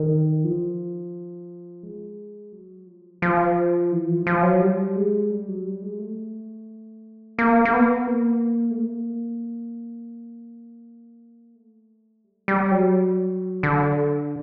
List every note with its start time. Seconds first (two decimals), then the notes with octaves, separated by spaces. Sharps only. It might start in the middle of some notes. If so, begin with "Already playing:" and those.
Already playing: D#3
0.44 F3
1.83 G#3
2.52 F#3
2.87 F3
3.22 F3
3.92 E3
4.09 F3
4.27 F3
4.43 F#3
4.61 G3
4.96 G#3
5.31 G3
5.48 F#3
5.64 G3
5.82 G#3
5.99 A3
7.39 A#3
7.65 A#3
7.73 B3
8.07 A#3
8.71 A3
8.77 A#3
11.56 A3
12.24 G3
12.48 G3
12.71 F#3
13.63 D3